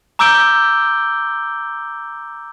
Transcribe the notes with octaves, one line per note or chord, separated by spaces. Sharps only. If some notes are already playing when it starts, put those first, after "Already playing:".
A#5 D6 E6 G6 D7 G7